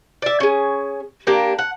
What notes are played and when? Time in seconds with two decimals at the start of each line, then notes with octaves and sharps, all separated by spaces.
0.22 D5 E5
0.40 C#4 G#4
1.27 A#3 D4 G4
1.59 F#5